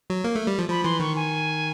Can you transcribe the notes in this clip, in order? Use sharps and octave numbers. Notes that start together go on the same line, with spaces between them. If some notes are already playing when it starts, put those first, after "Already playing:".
F#3
A#3
A3
G3
F3
F3 B5
E3 C6
D#3 C#6
G#5